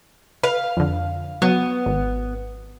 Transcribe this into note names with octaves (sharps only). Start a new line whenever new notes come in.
B4 F5
F2 D3
F#3 B3
G#1